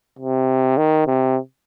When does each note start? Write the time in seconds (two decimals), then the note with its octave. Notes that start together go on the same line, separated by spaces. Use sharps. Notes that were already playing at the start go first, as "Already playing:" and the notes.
0.19 C3
0.77 D#3
1.07 C3